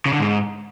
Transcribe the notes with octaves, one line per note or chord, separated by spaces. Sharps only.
C#3
D3
G#2